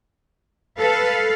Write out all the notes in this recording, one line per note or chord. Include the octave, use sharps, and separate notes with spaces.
A4 B4 F5